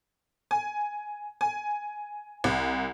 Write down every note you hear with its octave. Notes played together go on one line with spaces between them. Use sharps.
G#5
G#5
C2